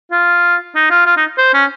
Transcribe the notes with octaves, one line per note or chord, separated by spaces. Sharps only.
F4
D#4
F4
F4
D#4
C5
C#4